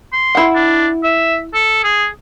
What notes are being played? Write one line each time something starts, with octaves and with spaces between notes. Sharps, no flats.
C6
E4 F#5
D4
E5
A4
G#4